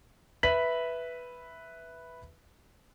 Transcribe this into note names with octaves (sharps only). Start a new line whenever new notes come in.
B4 E5 B6 F#7